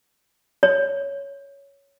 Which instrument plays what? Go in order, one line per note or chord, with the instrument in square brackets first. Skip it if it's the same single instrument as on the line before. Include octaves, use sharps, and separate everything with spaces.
[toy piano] C#5